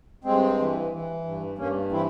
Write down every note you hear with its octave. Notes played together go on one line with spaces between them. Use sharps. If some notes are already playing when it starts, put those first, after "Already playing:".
G2 G#3 C4
E3
E3
G2
G2 A#3 C#4
E3 C4 E4